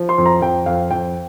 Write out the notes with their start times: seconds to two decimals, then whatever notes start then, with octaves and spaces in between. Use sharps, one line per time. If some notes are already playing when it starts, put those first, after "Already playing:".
Already playing: F3
0.09 C6
0.18 F2
0.26 A#5
0.41 F2 G5
0.66 F2 F5
0.91 F2 G5